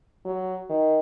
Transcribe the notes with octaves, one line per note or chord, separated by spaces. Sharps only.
F#3
D#3